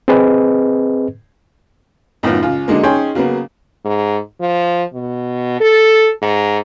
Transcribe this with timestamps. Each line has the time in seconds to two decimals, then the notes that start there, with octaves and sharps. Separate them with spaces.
0.08 C4 G#4 B4 D#5
2.23 F#2 A2 D#3 B3 F4
2.43 C#2 F4
2.68 D3 F#3 G#3 A#3
2.83 C#4 D#4 G#4 C#5 G5 C6
3.15 C#3 F#3 A#3 B3
3.85 G#2
4.41 F3
4.94 B2
5.60 A4
6.22 G#2